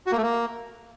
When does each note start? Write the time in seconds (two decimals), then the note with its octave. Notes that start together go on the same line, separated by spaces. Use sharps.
0.07 F#4
0.12 A#3
0.17 A3
0.23 A#3